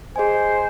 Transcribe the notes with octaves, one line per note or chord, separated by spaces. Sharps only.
G#4 C5 D#5 G#5